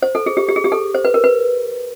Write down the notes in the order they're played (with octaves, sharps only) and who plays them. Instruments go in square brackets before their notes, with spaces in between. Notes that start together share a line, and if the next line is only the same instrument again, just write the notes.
[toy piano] C5
A4
G#4
G4
G4
G#4
G4
A4
C5
B4
A#4
B4